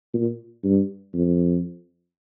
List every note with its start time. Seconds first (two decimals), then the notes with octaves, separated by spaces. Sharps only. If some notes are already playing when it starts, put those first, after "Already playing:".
0.14 A#2
0.64 G2
1.14 F2